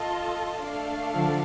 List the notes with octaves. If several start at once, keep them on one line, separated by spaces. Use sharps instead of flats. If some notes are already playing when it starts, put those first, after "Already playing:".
Already playing: F4 A4 D#5 A5
A3 D4 A4 D5 F5
D3 F3